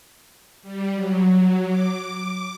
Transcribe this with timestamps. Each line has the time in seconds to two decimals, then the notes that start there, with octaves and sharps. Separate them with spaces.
0.63 G3
0.94 F#3
1.67 D6